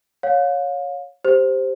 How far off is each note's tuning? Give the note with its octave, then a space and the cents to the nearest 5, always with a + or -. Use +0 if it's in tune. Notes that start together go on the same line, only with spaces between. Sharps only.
C#5 +0 F5 +30
G4 +0 C5 +0